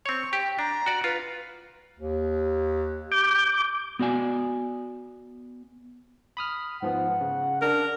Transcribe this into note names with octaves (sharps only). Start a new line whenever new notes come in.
C4 C#5 C#6
G4 G5
D4 A#5
F#4 D5
F4 B4
D#2
D6 G6
B3 F#4 D5 G#5
B5 D#6 F6
G#2 F3 B3 F#5
C#3
D4 A#4